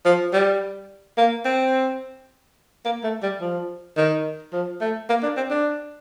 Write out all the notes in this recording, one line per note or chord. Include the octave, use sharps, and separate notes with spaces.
F3
G3
A#3
C4
A#3
A3
G3
F3
D#3
F3
A3
A#3
D4
C4
D4